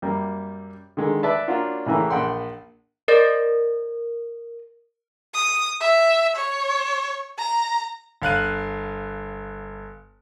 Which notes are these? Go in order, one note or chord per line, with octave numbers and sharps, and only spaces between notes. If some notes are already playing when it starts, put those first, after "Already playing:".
F#2 G3 A#3
D3 D#3 G#3
B4 D5 E5 A5 B5
A#3 C#4 D4 F4 F#4
A2 C#3 E3 A#3
A#1 F#5 G5 C6
A#4 C5 D5 D#5
D#6
E5
C#5
A#5
G1 F5 F#6 D#7